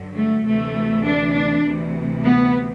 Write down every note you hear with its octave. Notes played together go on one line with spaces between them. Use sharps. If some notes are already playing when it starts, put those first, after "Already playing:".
Already playing: G2 D3 F#3
A3
D2 C3 E3 A3
D4
D4
D2 C3 E3
B3